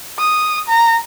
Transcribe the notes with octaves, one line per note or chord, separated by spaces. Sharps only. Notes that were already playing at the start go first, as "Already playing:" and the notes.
D#6
A#5